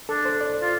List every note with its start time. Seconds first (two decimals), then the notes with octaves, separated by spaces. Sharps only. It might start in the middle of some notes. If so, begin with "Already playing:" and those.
0.09 D4 A4
0.25 C5
0.41 D5
0.62 F4